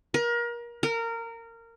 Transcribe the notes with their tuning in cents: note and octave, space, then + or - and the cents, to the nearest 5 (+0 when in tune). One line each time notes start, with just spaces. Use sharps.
A#4 +30
A#4 -20